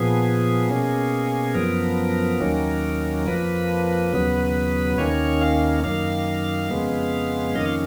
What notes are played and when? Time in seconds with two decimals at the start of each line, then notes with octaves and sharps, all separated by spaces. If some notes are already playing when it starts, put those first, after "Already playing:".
Already playing: A#2 F3 B3 G#4
0.69 B2 A#3 C#4
1.54 F#2 F3 B3 A#4
2.41 D#2 D#3 F#3 A#3 C#4
3.27 F2 F3 A#3 B4
4.13 D#2 C#3 F#3 B3
4.98 D#2 D#3 A#3 C#4 C#5
5.41 F5
5.84 F#2 D#3 A#3 F5
6.70 F2 C#3 G#3 B3
7.55 F2 D#3 A#3 C#4 D#5
7.66 F5